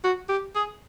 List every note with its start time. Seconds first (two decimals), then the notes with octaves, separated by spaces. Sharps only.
0.04 F#4
0.29 G4
0.55 G#4